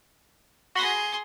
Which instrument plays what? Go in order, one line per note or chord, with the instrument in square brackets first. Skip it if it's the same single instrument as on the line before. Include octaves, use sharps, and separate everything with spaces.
[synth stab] F#4 B5 A#6 [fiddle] G#4 C6